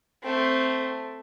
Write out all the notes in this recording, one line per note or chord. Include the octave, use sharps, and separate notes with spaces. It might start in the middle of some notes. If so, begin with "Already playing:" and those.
A3 C4